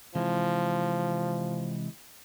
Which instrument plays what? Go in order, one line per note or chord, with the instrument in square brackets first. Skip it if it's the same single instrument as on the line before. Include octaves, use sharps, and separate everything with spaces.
[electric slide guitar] C3 E3 G#3 [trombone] F3